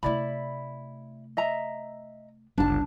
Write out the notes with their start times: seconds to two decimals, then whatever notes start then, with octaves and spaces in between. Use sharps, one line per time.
0.03 C3 A3 E4 D5 B5
1.37 D#5 E5 A#5
2.58 G1 C#2 D4 A5